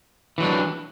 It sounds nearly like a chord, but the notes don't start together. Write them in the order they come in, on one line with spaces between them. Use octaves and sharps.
E3 F#3 D4